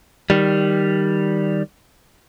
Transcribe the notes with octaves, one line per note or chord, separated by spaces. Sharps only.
D#3 G3